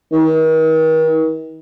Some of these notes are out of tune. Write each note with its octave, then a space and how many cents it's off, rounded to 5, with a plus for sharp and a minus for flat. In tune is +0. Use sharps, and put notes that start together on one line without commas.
D#3 +40